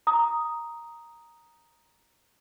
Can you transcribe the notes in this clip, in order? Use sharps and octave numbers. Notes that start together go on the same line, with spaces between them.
A#5 D#6